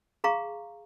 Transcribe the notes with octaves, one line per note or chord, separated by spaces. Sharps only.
G#4 F5 A#5 C#6